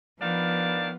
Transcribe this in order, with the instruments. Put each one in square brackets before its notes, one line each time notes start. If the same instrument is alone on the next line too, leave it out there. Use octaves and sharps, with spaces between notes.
[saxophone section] D#3 D4 F5 [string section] F3 B3